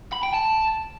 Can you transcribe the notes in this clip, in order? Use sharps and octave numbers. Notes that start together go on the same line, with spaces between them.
B5
G5
A5